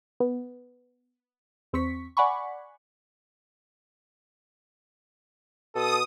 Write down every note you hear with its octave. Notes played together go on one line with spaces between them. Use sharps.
B3
E2 C4 C#6 B6
D5 F#5 G#5 B5 C#6
B2 A4 D#6